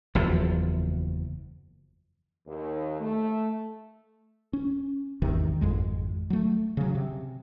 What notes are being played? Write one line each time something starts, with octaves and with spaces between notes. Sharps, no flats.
F#1 E2 F3
D#2
A3
C#4
G#1 E2 C3 D#3
G#1 F2 G#3
F#3 A3
C#3 F#3
C3